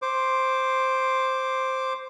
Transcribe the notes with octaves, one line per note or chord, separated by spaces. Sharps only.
C5 D6